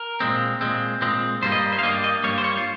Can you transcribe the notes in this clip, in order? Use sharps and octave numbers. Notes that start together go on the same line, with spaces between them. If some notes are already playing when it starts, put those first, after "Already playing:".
Already playing: A#4
A#2 G#3 C4
A#2 G#3 C4
A#2 G#3 C4
G2 G3 A#3 C5
D#5
C5
F5
G2 G3 A#3 D#5
D#5
G2 G3 A#3 C#5
C5
C#5
F4